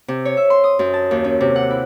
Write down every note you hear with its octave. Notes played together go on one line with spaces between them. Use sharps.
C3
C#5
E5
C6
D#6
F#2
A5
D#2
C#4
C3
F#5
E4